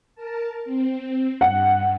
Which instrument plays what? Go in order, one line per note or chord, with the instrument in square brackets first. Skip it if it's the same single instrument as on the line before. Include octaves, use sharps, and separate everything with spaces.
[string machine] A#4 A5
C4
[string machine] G2 [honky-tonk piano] F#5